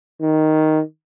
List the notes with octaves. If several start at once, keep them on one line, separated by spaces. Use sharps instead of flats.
D#3